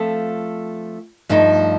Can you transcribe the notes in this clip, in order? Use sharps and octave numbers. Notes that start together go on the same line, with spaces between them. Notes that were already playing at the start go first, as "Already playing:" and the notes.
Already playing: F3 A3 C4 F4 A4
G2 F3 A3 D#4